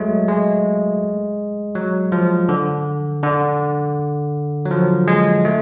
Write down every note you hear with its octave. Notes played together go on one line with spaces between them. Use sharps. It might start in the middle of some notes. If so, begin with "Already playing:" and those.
Already playing: F#3 G#3 A3
G#3
F#3
F3
D3
D3
F#3
F3
G#3
A3